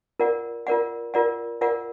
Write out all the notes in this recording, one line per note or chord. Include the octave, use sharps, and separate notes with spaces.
F4 A#4 D5 F#5
F4 A#4 D5 F#5
F4 A#4 D5 F#5
F4 A#4 D5 F#5